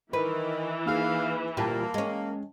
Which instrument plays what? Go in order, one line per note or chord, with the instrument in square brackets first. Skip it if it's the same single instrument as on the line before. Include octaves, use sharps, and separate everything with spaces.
[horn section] D#3 [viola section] E3 [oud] B4
[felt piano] A#3 D#4 G#4 [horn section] F5
[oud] D2 A#2 G3 [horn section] A#3 [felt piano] G5 A5
[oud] G#3 C#4